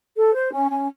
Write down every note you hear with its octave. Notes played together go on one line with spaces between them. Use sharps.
A4
C5
C#4
C#4